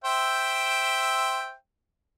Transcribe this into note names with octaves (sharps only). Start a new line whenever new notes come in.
C5 E5 G5